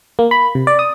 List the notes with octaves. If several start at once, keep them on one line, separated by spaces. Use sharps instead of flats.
A#3
B5
C3
D5
D#6